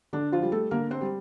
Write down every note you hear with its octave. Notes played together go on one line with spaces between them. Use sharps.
D3 D4
F3 F4
G3
A3 A4
D3 A#3 A#4
C4 C5
G3